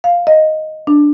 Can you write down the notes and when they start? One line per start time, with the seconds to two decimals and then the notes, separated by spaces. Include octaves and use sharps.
0.04 F5
0.27 D#5
0.87 D4